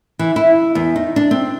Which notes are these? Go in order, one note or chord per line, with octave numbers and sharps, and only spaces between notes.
E3
E4
E2
D#4
D4
C4